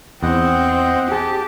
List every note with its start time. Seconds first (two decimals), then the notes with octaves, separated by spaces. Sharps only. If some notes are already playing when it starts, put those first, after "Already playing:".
0.23 E2 C4 D#5 F#5 G5
1.12 G4 G#4 A5